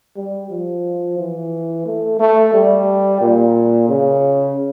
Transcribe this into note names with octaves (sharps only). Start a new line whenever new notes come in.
G3
F3
E3
A3
A3
G3
A#2
C#3